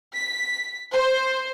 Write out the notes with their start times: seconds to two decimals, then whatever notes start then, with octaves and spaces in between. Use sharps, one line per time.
0.14 B6
0.93 C5